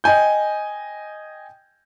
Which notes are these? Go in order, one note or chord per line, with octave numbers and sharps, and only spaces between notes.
D#5 G5 G#5 G6